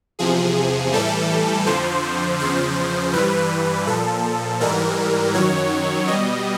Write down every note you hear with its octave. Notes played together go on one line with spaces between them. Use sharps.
E2 C3 F3 G#4
A2 E3 G3 A4
F2 D3 F3 C5
E2 C#3 F3 C5
G2 E3 G3 B4
A#2 F3 A4
G#2 E3 G3 A#4
F#2 D#3 F#3 C#5
B2 G3 D#5